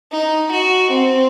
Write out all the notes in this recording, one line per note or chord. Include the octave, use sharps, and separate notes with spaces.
D#4
F#4
C4